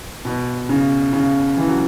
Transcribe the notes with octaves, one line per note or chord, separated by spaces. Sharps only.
B2
C#3
C#3
E3
F#3